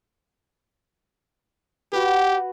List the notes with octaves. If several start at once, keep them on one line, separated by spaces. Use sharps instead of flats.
F#4 G4 B4